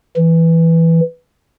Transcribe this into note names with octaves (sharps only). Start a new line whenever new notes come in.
E3